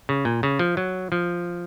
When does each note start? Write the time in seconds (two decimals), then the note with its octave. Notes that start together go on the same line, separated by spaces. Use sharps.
0.09 C#3
0.25 A#2
0.43 C#3
0.59 F3
0.77 F#3
1.12 F3